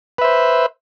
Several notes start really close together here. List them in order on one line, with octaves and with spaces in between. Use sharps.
B4 E5 C5